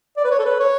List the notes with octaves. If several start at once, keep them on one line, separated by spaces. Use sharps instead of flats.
D5
B4
C#5
A4
B4
C#5